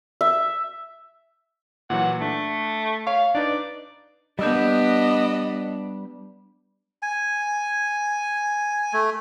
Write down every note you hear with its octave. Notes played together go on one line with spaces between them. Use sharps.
E5
A#2 E3 F#3 F#5
A3 D4
C#5 F5 C#6
D4 D#4 B4 D5
G3 B3 D4 D#5 E6 G6
G#5
A3